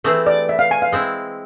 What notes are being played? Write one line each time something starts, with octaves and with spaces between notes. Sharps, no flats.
E3 A3 C4 G#4
D5
E5
F5
G#5
F5
G#3 C4 E4